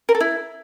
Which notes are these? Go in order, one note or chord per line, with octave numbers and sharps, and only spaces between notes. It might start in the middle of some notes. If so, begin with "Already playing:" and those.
A#4
A4
E4